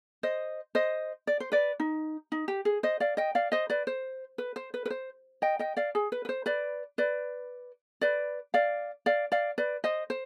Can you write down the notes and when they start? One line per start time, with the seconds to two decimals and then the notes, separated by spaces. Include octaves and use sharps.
0.23 C5 D#5
0.75 C5 D#5
1.27 D5
1.40 C5
1.52 B4 D5
1.80 D#4
2.32 D#4
2.48 G4
2.65 G#4
2.83 C5 D#5
3.00 D5 F5
3.17 D#5 G5
3.35 D5 F5
3.52 C5 D#5
3.70 B4 D5
3.87 C5
4.38 B4
4.56 C5
4.74 B4
4.86 B4
4.90 C5
5.42 D#5 G5
5.59 D#5 G5
5.77 D5 F5
5.95 G#4
6.12 B4
6.25 B4
6.29 C5
6.46 B4 D5
6.98 B4 D5
8.01 B4 D5
8.54 D5 F5
9.06 D5 F5
9.32 D5 F5
9.58 B4 D5
9.84 C5 D#5
10.10 C5